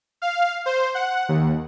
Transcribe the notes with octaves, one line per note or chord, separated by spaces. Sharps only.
F5
C5
F#5
D#2